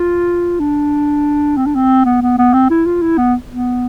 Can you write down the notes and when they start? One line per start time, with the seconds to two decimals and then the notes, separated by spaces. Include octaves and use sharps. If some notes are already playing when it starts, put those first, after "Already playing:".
Already playing: F4
0.60 D4
1.57 C4
1.67 D4
1.75 C4
2.05 B3
2.22 B3
2.38 B3
2.53 C4
2.70 E4
2.86 F4
3.02 E4
3.18 B3
3.50 B3